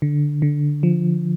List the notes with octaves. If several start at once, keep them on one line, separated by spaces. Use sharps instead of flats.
D3
D3
F3